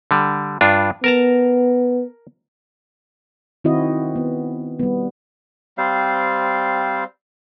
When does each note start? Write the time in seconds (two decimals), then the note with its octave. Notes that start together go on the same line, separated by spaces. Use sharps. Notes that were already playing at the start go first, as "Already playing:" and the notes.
0.11 D3 G3
0.61 G2 D4 F4
1.04 B3 A#4 A5 A#5
3.64 D#3 C4 E4 F#4 D#5
4.16 B3
4.79 G3 B3
5.78 G3 C4 C5 F5